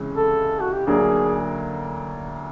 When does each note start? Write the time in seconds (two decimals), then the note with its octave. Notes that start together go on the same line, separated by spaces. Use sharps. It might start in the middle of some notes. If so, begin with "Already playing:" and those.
Already playing: C#2 C3 E3 G#3 C#4
0.17 A4
0.61 F#4
0.73 G4
0.87 D2 D3 F#3 A#3 D4 G#4